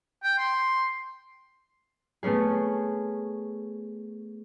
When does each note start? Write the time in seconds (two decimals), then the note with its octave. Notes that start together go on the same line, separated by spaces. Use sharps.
0.23 G5
0.38 C6
2.23 A3 B3 C#4 G#4